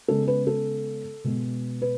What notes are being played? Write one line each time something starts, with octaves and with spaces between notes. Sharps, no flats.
C#3 G#3 B3 A4
B4
A4
B2 G#3 B3
B4